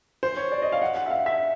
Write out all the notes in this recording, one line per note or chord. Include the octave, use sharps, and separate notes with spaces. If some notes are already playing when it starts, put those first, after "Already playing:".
C5
C#5
D5
D#5
F5
F#5
F#5
E5
F5
E5